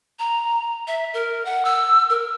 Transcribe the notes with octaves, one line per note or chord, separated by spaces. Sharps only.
A#5
E5
A#4
F#5
E6
A#4